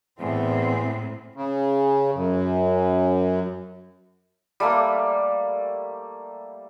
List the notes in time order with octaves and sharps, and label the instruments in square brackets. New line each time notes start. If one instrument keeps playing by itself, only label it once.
[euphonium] E2 [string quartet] A2 [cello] C4
[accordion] C#3
F#2
[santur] G3 A3 A#3